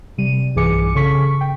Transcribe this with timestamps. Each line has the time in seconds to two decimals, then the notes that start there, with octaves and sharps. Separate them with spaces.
0.18 C3 G3 D#7
0.56 B1 G2 E3 G#4 D6 C#7
0.95 C#3 A4 C#6 B6
1.41 G5